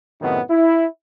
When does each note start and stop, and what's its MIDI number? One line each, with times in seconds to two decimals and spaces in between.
0.22 0.40 42
0.22 0.40 45
0.22 0.40 48
0.22 0.40 51
0.22 0.40 59
0.22 0.40 63
0.50 0.86 64